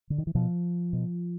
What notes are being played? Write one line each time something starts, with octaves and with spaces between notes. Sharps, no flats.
D3
D#3
E3
B2 F3
B2